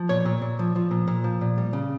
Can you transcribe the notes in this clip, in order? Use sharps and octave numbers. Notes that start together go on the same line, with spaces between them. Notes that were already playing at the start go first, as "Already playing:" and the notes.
Already playing: F3
A#2 C#5
A#2
A#2
F3
F3
A#2
A#2
F3
A#2
G3
C#3